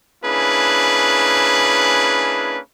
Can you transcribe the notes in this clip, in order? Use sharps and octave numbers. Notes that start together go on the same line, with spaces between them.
A#3 C#4 D4 E4 G#4 B4